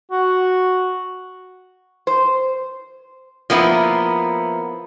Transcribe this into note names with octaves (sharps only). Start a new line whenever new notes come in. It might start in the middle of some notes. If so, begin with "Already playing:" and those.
F#4
C5
F3 A#3 B3 E4